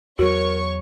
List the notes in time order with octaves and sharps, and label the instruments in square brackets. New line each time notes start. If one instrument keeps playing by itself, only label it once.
[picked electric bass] E2 F#3 [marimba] F#4 [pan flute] A#4 [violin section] C#5 C#6